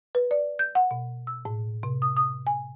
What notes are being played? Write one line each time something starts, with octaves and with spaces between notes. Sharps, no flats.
B4
D5
G6
F#5
B2
E6
A2
C3
D#6
D#6
G#5